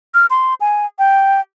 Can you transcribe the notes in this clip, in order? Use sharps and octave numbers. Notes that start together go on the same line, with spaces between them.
F6
C6
G#5
G5